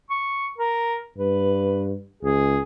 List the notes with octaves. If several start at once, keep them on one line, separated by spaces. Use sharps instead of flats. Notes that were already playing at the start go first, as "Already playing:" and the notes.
C#6
A#4
G2 B4
C#2 G#4